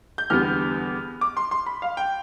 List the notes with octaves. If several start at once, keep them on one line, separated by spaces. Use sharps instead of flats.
G6
E2 D3 G3 B3 F6
D6
C6
C6
B5
F5
G5